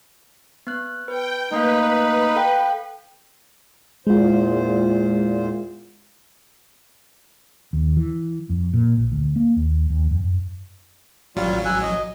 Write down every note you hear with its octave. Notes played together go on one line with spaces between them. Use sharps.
B3 F#6
B4 G5
A3 A#3 D#4 B4 F5
A4 F5 G5
E2 A#2 G#3 F4 C5
D#2
E3
F2
A#2
A#1
D2
A#3
D#2
D#2
F2
F#2
A1 F#3 G3 F4
G#5 E6 F#6
D#5